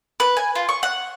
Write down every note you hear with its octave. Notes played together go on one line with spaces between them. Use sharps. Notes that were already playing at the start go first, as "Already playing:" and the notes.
B4
G#5
F4
C#6
F#5